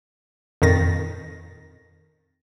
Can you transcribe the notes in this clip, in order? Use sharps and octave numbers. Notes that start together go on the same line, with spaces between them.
F2 A#2 D#3 A6 A#6